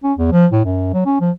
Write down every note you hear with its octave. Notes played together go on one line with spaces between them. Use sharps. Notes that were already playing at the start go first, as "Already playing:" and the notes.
C#4
E2
F3
A2
F#2
F#3
C#4
F3